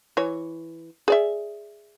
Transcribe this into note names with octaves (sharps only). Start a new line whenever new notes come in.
E3 C#5
G#4 D5 E5